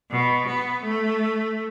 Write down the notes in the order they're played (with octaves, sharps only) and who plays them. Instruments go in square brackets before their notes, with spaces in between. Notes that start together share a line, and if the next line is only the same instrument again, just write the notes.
[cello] B2
B3
A3